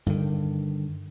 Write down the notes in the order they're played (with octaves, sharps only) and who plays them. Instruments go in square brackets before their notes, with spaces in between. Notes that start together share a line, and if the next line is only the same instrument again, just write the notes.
[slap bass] G2 D3 D#3